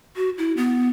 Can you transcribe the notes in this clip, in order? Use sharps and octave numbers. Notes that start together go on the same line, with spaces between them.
F#4
E4
B3